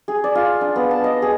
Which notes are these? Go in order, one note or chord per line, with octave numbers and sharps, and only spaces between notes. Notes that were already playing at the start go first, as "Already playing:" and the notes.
G#4
D5
F4
D4
B3
A5
D#5
G#4